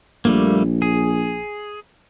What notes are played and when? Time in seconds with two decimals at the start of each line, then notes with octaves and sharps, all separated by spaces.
0.25 A#1 G3 A3 A#3
0.82 G#4